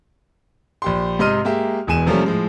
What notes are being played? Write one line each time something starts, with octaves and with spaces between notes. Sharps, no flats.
A#1 G4 C6
G#2 C3 D#5 C6 F6 D#7
G#3 A#3 G4 E5
E1 E2 G#3 G#5 D#7 E7
C3 F3 G3 A3 A#3 C#4
A2 F3 G#3